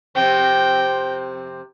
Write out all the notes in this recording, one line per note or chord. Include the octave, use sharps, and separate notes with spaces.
F2 C3 C4 G5